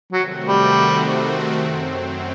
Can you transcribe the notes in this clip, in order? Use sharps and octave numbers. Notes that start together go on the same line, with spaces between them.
C3 D#3 F#3 A3 C4 F#4
G3
F#2 F#3 C4